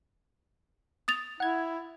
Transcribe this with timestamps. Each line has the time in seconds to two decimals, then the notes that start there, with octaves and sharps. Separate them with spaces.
1.08 D#6 A6 F7
1.40 E4 F#5 G#6